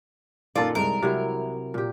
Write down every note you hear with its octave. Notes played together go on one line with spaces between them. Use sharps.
A#2 D#3 F4 A4 D5
C2 G#3 A#4
C3 F#3 E4
A#2 G4